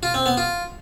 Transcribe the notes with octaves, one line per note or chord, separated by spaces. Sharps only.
F4
C4
B3
F4